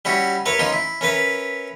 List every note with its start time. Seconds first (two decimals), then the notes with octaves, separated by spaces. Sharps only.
0.05 G3 C#4 E4 F#4
0.46 E4 A#4 B4 C#5
0.60 C#4 D#4 F4
0.72 E4
1.01 C#4 A#4 B4 E5